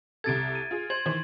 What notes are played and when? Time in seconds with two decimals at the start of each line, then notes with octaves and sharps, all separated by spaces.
0.24 C2 C3 A4 G#6 A6 D7
0.55 D#7
0.71 F4 G#4
0.90 C5 G#6 F#7
1.05 D#3 E3 C5